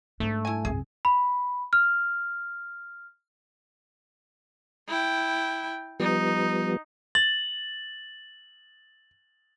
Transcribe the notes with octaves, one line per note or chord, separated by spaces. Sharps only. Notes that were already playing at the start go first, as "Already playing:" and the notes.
G#2 G3 A3 D4
E4 G#5
C2 F#2 G#4
B5
F6
E4 G5
F3 G3 B3 D#4
A6 F#7